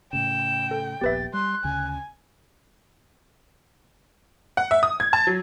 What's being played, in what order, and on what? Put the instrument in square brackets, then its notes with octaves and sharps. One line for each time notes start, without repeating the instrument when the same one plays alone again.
[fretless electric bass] A2 C#3 [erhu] G5 [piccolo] E7
[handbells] A4
[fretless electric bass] D#1 A#1 B3 [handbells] G4 B4 E5 [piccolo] A6
[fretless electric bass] G3 [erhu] C6 [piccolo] F#6
[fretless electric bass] D2 C#3 [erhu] G#5
[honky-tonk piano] F#5
E5
D#6
G#6
A5
F#3